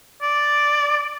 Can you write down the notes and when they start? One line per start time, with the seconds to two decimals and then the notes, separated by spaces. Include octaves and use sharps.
0.22 D5